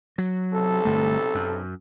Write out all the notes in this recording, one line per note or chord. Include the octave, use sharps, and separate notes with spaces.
F#3
B1 C3 A4
G1 A3
F#2